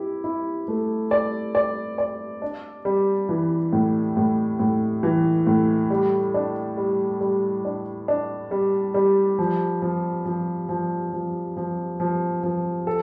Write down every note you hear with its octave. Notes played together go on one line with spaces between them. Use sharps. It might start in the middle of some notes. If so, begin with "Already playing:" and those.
Already playing: E4 G4
E4
A3
D5
D5
D5
D4
G3
E3
A2
A2
A2
E3
A2
G3
D4
G3
G3
D4
D4
G3
G3
F3
F3
F3
F3
F3
F3
F3
F3
A4